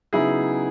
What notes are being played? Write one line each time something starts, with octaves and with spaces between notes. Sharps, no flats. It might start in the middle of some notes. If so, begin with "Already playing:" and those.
C#3 F#3 B3 D#4 E4 G#4